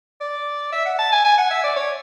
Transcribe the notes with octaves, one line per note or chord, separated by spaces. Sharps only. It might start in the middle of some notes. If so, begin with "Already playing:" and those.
D5
E5
F#5
A5
G#5
G#5
F#5
E5
D5
C#5